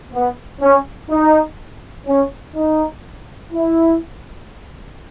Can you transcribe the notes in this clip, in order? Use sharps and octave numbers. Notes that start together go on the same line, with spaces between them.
B3
C#4
D#4
C#4
D#4
E4